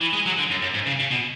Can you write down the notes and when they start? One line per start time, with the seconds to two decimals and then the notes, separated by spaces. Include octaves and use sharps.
0.01 E3
0.13 G#3
0.26 F#3
0.38 D3
0.50 F#2
0.62 F#2
0.74 G#2
0.86 C#3
0.99 C#3
1.10 B2